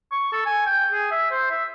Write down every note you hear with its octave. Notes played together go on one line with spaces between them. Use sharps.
C#6
A4
G#5
G5
G#4
E5
C5
E5